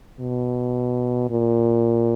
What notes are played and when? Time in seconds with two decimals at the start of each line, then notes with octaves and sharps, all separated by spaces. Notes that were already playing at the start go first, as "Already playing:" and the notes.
0.20 B2
1.30 A#2